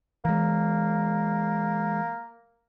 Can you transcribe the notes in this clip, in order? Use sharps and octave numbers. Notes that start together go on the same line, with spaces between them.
E3 G#3 A#3